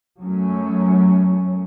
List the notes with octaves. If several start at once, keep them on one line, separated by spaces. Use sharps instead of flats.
F#2 F#3 A3 C#4